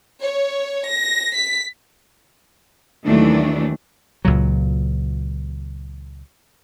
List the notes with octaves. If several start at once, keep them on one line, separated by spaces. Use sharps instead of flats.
C#5
A#6
B6
D#2 D#3 E3 F#3 A3 D4
C#2 A#2 F#3